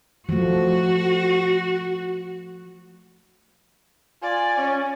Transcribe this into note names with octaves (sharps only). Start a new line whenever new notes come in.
F3 A3 F#4
F4 D5 G#5
C#4